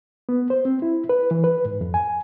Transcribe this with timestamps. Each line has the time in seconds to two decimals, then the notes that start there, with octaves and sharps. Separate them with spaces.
0.29 B3
0.50 C5
0.65 C4
0.82 E4
1.09 B4
1.31 E3
1.44 B4
1.65 G#2
1.81 F2
1.94 G#5